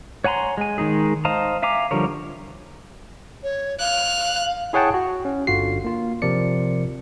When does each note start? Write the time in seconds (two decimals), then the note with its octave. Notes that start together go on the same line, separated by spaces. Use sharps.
0.24 C#5 F#5 G#5 A#5 C6
0.58 G#3 G#5
0.78 D#3 G#3 D#4 G#4
1.25 C5 D#5 F5 A5 A#5
1.62 E5 F5 G#5 A#5 D6
1.91 D3 F3 G3 A#4 C#5
3.43 C#5
3.80 F5 F6 F#6
4.73 E4 G#4 C#5 F#5 G5 A5
4.94 F#4
5.25 C#4
5.47 G1 D3 F4 F#4 C7
5.84 A#3 F4
6.22 C3 F3 A#4 D5 C#7